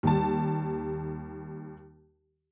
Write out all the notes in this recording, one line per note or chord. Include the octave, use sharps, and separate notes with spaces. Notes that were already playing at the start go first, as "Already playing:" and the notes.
D#2 G3 A5